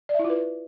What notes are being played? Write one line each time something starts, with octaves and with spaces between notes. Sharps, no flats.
D5
E5
E4
F4
B4